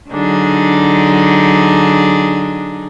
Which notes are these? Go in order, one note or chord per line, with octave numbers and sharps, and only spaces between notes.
D3 F#3 D4 D#4 G#4